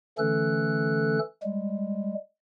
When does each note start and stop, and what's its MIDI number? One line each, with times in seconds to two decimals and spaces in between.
0.18 1.19 50
0.18 1.19 52
0.18 1.19 57
0.18 1.19 61
0.18 1.19 69
0.18 1.19 90
1.43 2.14 55
1.43 2.14 56